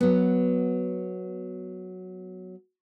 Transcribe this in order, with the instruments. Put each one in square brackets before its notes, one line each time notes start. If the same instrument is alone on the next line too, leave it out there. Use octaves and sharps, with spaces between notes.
[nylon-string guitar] F#3 B3